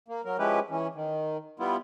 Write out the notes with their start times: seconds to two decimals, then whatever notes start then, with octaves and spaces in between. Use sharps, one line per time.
0.08 A#3
0.25 F#3 A#4
0.39 F3 G#3 C#4 E4 G4 B4
0.70 E3 C#4
0.95 D#3
1.60 G3 B3 E4 F4